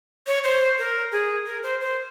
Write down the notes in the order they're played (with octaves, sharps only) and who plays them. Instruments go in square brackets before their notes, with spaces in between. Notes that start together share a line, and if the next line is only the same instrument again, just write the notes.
[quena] C#5
C5
A#4
G#4
A#4
C5
C5